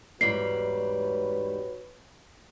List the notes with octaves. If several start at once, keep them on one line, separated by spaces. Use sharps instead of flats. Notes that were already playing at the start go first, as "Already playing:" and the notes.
E2 G#2 G3 F#4 B4 C#5 C7